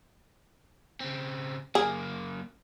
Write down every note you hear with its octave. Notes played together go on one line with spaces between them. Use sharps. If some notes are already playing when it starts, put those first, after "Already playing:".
C#3 C4
F#2 A#3 G#4